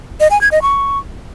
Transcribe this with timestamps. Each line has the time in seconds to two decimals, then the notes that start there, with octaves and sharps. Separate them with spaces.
0.20 D#5
0.31 G#5
0.41 G#6
0.51 D#5
0.62 C#6